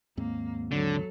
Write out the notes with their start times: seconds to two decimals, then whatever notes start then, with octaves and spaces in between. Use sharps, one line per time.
0.17 D#2 G#2 A#3 C4
0.71 D3 F#3 A4